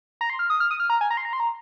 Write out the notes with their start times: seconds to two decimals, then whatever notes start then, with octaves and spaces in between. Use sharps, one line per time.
0.21 A#5
0.30 C6
0.39 F6
0.50 D#6
0.60 F6
0.71 D#6
0.80 F6
0.90 A#5
1.01 G#5
1.11 A#5
1.17 C6
1.25 A#5
1.33 C6
1.40 A#5